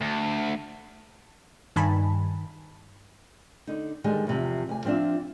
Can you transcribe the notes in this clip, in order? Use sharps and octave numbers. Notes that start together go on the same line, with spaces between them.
D2
G2 D#3 G#5 A5 B5
D3 D#4
D3 D#3 G3 G#3
E2 C3 F3
D2 G#5
F3 C4 D4 F4 E5